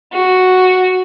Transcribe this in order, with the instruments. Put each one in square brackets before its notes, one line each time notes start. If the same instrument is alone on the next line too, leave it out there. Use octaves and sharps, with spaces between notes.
[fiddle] F#4